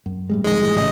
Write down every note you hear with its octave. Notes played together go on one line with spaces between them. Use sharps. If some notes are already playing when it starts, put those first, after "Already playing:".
F#2
A2 G3 G#3
B1 F2 D#3 G#3 D#5
A2 E3 G3
A1 A2 C#3 D#5